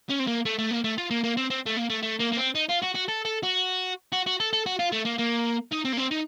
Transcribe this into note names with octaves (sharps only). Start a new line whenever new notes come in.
C#4
C4
A#3
A3
A3
A#3
A3
F4
A#3
A#3
C4
C4
A3
A#3
A3
A3
A#3
A#3
C4
D#4
F4
F#4
F#4
A4
A4
F#4
F#4
F#4
A4
A4
F#4
F4
A3
A#3
A#3
D#4
C4
A#3
C4
D#4